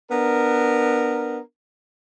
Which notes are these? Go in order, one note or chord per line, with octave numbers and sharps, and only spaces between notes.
B3 D4 A#4